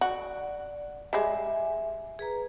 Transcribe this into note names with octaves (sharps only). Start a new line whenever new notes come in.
F#4 D5
G3 G#3 E5 G#5
G#4 B4 A#5